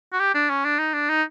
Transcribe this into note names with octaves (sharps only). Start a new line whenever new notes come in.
F#4
G4
D4
C#4
D4
D#4
D4
D#4